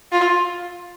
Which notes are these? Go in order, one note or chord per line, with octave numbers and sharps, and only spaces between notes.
F4